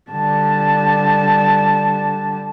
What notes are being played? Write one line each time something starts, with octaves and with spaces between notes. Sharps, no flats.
D3 G3 A5